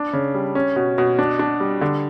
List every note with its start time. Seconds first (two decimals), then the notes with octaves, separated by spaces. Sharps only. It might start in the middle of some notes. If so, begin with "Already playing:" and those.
Already playing: D4
0.13 C#3
0.34 G3
0.55 C#4
0.76 B2
0.98 B2
1.19 D4
1.39 D4
1.60 G3
1.81 D3